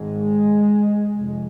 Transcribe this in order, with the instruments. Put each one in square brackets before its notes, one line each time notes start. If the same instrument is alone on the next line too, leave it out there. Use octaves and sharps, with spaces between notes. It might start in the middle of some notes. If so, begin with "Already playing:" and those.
Already playing: [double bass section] G#1 G#2 G#3
F1